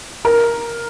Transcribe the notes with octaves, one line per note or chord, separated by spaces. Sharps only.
A#4